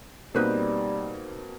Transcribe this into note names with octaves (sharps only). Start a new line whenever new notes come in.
B2 G3 A#3 C4 D#4 B4 C5